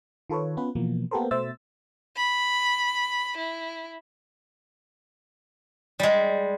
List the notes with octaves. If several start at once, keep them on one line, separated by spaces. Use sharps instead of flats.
D#3 F4 A4 B4 C#5
B3 C#4 F4 B4
B2 E3 F3 A#3 B3
A#3 B3 G4 A4 A#4 C5
B2 A3 C5 E5 E6 A6
B5
E4
G3 G#3